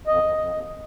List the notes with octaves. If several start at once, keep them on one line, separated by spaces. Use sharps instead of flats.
F2 D#5
F2
F2
D#2